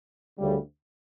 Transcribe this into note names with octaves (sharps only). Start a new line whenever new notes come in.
D2 C#3 G3